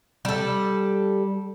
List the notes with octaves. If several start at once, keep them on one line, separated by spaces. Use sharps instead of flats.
G3 A4